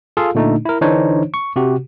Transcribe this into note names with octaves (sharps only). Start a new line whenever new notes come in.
F4 G#4 A4 F5
A#2 D3 A3 D4 D#4
E4 A#4
D3 E3 D4 D#4 C5 C#5
C#6
C3 F#4 G4